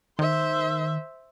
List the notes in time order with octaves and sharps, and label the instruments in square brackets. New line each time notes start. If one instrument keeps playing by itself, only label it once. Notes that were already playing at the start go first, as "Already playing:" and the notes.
[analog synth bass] D#3 [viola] C5 E5